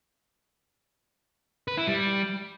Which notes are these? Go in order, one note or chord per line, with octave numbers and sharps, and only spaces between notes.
B4
E4
G3